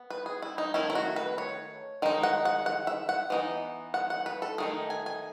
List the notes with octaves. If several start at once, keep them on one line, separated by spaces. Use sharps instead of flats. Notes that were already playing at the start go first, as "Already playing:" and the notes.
Already playing: B3
B4
G#4
E4
D#4
D#3 A3 C#4 E4
E4
F#4
B4
C#5
D#3 G#3 D#4
F#5
F#5
F#5
E5
F#5
E3 B3 D#4
F#5
F#5
B4
A4
D#3 A3 D#4 G#4
G#5
G#5